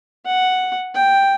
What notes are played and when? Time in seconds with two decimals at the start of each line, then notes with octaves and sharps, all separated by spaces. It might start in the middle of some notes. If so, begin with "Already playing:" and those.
0.26 F#5
0.95 G5